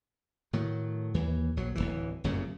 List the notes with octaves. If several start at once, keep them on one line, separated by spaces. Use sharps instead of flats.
A2 D#3 F#3
D#2 E3
A#1 F#3
D1 G1 E3
G1 F#2 A#2 C#3